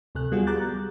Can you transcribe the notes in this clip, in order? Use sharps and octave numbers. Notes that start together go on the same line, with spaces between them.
D2 C3 A4 F#6
G3 B3 F4 F#4 G#4
A#5 D6 F#6 G6 A6
G3